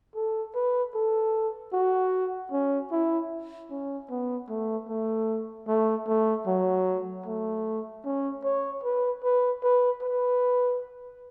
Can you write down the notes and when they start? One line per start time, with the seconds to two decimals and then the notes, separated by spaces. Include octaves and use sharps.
0.15 A4
0.55 B4
0.95 A4
1.73 F#4
2.52 C#4
2.92 E4
3.71 C#4
4.10 B3
4.50 A3
4.89 A3
5.68 A3
6.08 A3
6.47 F#3
7.26 A3
8.05 C#4
8.45 C#5
8.84 B4
9.24 B4
9.63 B4
10.03 B4